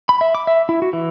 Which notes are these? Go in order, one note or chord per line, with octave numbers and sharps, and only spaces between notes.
B5
E5
D6
E5
E4
F#4
E3